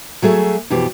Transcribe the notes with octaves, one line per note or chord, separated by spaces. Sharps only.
F#3 A3 G#4 E5
F2 B2 E3 G4